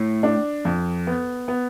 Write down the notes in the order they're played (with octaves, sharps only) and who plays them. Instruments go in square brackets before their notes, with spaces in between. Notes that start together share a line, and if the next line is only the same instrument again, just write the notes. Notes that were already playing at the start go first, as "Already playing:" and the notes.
Already playing: [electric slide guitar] A2
[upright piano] D4
F2
B3
B3